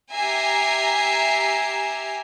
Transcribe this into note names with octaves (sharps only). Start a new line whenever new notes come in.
G4 E5 G#5 A#5 C7